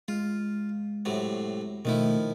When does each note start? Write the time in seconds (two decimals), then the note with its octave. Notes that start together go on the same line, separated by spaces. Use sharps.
0.08 G#3 F4
1.05 A2 C3 F#3
1.85 B2 D#3 F3 A3 E4